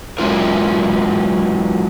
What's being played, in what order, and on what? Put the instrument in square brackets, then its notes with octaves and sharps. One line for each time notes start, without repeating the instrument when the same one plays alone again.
[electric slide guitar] F#3 G#3 C#4 E4 F4 A#4